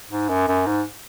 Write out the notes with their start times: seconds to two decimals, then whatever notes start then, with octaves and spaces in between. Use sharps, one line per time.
0.10 G#2
0.29 F#2
0.48 F#2
0.67 G#2